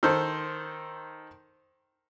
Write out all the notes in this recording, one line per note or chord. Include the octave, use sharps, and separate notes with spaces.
D#3 A4 C5